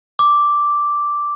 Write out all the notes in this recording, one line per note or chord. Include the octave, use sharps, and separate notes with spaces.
D6